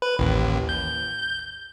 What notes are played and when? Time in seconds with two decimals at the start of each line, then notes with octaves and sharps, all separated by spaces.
0.02 B4
0.19 A1 D#2
0.69 G6